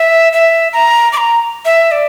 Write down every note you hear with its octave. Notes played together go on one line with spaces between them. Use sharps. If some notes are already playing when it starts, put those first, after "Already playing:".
Already playing: E5
E5
A#5
D6
A#5
E5
D5